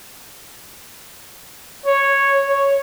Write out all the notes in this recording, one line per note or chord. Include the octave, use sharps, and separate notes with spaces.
C#5
C#5